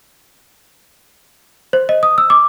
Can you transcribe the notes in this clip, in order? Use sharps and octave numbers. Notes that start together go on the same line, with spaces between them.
C5
D#5
D#6
E6
D6